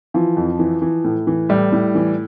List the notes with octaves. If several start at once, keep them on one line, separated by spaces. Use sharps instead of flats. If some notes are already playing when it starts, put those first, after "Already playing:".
E3 F3
F2
E3
E3
A2
E3
A2 G3
A2
E3